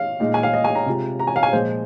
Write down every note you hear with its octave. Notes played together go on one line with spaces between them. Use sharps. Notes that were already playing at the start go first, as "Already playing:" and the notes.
Already playing: F5
A#2 G#3 D#4
G#5
F5
D#5
G#5
A#5
C3 G#3 F4
A#5
G#5
F5
G#5
A#2 F3 G#3 F4 C5